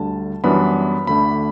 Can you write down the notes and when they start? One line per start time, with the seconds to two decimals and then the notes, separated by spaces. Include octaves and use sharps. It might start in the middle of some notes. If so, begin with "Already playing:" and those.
Already playing: D2 D3 G3 A5
0.44 F#2 E3 G3 B3 D4 B5
1.07 D2 D3 A3 D4 B5